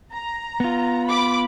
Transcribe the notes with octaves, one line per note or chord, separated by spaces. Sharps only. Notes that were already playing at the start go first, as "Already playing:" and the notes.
A#5
B3 F4
B5 D6